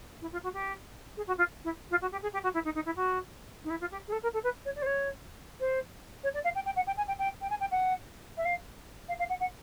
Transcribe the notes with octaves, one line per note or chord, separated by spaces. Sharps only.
E4
F4
F#4
G4
G#4
F#4
F4
E4
F4
F#4
G4
G#4
G4
F#4
E4
D#4
D#4
E4
F#4
D#4
E4
F4
G4
G#4
A4
A#4
A4
B4
C#5
D5
C5
C#5
C5
C#5
D5
F5
G5
G5
F#5
G5
G#5
G5
G5
G5
G#5
G5
F#5
E5
F5
F5
F5
F#5
F#5